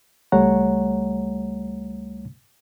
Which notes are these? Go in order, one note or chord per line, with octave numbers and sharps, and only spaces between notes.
C#2 G3 A3 C#5 F#5 A#5